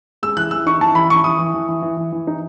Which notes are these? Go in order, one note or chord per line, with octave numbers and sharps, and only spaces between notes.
G#3 E6
E3 F#6
E3 E6
D#4 C#6
E3 A5
E3 B5
E3 C#6
E3 D#6
E3
E3
E3
E3
E3
E3
D#4